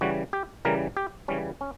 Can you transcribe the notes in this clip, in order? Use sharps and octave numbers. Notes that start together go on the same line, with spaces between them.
C#3 E3 G3 F#4
G4
C#3 E3 G3 A#4
G4
C#3 E3 G3 C#4
C#4